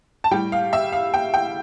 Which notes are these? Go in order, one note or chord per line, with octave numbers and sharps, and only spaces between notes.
A5
A2 G3 G5
F5
E5
F5
G5
G5